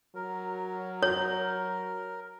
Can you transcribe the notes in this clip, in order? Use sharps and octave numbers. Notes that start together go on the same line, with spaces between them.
F#3 A#4
A#4 C#5